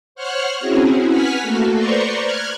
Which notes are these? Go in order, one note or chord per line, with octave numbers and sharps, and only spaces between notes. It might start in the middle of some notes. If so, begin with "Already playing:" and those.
C5 C#5 F#5 C#6 F6 F#6
C4 C#4 E4 F#4 G#4
B4 F#5 G#5 F6 B6
A3 A#3 F#4 A4
B4 C5 D5 A#5 C6 C#6
F6 F#6 G#6